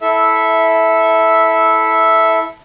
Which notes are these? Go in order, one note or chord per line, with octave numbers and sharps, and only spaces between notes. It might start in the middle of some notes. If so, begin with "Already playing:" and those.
E4 A4 E5